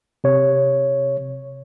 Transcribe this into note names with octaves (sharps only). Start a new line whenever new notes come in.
C3 C#5